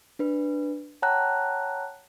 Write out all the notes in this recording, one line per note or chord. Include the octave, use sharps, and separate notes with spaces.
D4 B4
C#5 F#5 G5 A5 A#5 F#6